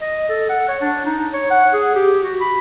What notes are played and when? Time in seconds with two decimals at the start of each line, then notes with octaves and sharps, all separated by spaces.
0.01 D#5
0.29 A4
0.49 F#5
0.68 C#5
0.81 D4
1.06 D#4
1.33 C#5
1.50 F#5
1.73 G#4
1.95 G4
2.23 F#4
2.40 B5